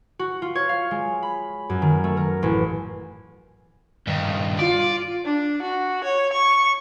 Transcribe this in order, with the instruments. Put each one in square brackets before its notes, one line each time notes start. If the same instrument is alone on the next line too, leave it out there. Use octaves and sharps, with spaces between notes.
[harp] F#4
F4
C#5
F5
G#3
B5
F#2
D#3
A3
A#4
A1
[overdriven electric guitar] G2 D#3
[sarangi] F4 [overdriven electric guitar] D5
[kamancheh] D4
F#4
C#5
C#6